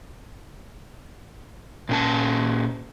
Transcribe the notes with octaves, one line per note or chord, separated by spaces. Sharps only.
A#2 C#4 A5